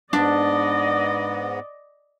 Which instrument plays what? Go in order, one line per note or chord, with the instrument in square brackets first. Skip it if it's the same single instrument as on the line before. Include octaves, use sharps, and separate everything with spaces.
[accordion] G#2 B3 [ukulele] D4 [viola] D5 D#5